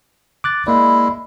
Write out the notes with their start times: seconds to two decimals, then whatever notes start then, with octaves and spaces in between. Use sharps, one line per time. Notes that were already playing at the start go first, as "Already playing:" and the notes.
0.44 D6 F#6 A6
0.67 G#3 A#3 E4 D5